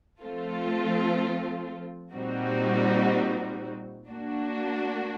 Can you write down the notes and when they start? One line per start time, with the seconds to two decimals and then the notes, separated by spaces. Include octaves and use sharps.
0.21 F3 A3 C4 F4 A4
2.14 A#2 G3 C4 D#4 F#4
4.07 A#3 D4 F#4